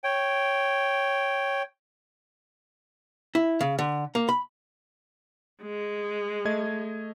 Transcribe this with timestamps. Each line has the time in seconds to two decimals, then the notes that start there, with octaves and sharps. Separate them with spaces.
0.04 C#5 G5
3.35 E4
3.61 C#3
3.79 D3
4.15 A#3
4.29 B5
5.62 G#3
6.45 A3 D#5 G#6